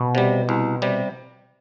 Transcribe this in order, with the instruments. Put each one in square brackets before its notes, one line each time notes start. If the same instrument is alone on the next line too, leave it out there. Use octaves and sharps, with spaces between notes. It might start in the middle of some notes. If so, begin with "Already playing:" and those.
Already playing: [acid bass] B2
[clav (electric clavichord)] C3 G3
C2
C3 G3